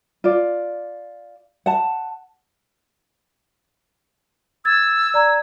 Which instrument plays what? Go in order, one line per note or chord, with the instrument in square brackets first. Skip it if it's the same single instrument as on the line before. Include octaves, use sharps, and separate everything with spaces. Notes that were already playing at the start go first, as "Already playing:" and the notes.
[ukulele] F4 D5
F#5 A5
[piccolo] E6 [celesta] G#6 A6
[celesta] D5 A#5 G#6